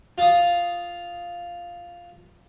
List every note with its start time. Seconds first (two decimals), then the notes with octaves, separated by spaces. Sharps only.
0.18 F4 F5 D#6